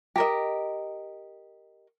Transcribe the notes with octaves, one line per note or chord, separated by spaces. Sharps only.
G4 A#4 D#5